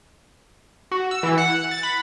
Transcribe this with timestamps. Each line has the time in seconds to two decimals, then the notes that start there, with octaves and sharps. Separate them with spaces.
0.91 F#4
1.11 E6
1.23 E3
1.38 F#5
1.71 A6
1.83 B5